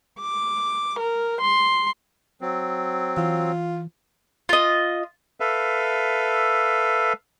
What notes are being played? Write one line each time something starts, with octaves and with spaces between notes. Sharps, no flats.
D6
A#4
C6
F#3 C4
E3 F4
F4 D#5
A4 B4 E5 F5